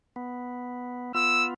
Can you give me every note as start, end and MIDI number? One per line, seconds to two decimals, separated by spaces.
0.16 1.12 59
1.15 1.54 59
1.15 1.54 65
1.15 1.44 88